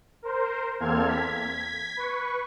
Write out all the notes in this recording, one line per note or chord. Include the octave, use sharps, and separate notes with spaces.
A#4 C5
E2 A#3 C4 A4 F6 G#6
G#6 B6
B4 C#6